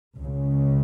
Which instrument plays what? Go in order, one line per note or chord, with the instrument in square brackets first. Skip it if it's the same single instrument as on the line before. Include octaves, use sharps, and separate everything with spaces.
[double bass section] C#2 C#3